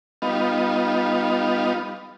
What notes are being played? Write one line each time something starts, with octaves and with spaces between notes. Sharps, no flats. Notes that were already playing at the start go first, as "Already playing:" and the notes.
G3 B3 D#4 F4